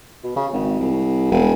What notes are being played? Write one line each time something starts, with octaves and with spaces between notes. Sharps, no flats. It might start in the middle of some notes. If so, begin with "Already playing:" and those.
B2
C#3
G#1
C2
E1